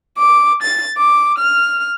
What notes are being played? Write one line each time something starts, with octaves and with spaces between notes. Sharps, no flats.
D6
A6
D6
F6